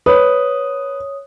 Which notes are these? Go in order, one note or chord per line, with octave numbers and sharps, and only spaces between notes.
B4 C#5 D#6